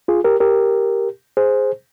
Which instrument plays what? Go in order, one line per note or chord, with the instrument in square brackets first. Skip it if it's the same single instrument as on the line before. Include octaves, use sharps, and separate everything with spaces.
[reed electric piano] F4 G#4
G4 A#4
G4 A#4
G#4 C5